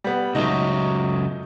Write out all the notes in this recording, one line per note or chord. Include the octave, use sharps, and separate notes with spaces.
G3 B3
C#2 F#3 A3 D#4 D#5